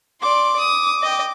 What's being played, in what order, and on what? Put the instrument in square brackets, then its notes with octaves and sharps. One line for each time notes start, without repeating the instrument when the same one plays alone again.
[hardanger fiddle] D5 C6 [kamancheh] D6
[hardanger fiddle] D#6
D#5 G5